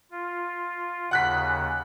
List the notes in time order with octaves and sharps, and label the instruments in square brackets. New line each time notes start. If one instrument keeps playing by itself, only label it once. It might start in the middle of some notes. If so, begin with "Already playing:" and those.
[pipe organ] F4
[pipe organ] D#2 C#3 [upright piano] F#5 F#6 B6